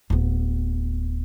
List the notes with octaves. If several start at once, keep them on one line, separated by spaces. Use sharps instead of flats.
D1 B3